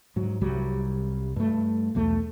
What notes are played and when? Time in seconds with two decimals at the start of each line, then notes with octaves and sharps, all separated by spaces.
0.16 G#2 F#3
0.41 C2 F#3 G3
1.36 G2 A3
1.95 B1 E2 A3